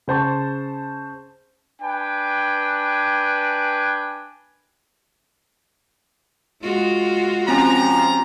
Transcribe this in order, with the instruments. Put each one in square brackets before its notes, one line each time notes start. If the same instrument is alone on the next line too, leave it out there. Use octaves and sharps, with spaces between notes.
[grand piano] C#3 C5 A5 C#6
[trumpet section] D4 B4 G5 G#5
[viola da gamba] G#3 F4 F#4
[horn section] F3 G4 A#5 [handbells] C4 C#4